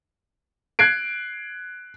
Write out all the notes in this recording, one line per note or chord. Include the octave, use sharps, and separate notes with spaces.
F#6 G#6 C7 D7